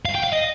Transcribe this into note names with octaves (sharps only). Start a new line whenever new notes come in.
F5
G5
F5
D#5